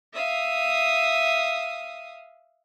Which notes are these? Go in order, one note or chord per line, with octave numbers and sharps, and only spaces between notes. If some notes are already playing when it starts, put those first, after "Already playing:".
E5 F5 D#6